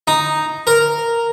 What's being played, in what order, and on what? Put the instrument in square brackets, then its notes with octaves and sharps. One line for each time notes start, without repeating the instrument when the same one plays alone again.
[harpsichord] D#4
A#4